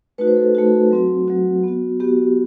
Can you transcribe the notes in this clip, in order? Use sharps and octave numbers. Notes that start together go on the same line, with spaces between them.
A3 D#4 F#4 B4
C5
A4
A3 D#4 F#4
F#3 C4 F#4
F#3 C4 F#4
B3 F#4
B3 F#4 G4